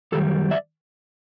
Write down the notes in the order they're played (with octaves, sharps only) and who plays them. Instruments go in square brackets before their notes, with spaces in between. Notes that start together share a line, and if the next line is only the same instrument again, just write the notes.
[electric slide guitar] F#2 D#3 G3 G4 A4
D5 E5